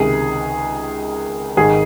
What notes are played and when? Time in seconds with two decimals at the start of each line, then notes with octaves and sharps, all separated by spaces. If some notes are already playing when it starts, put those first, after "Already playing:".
Already playing: C#2 C3 D#3 G#4
1.57 G#1 G#2 D#3 G#4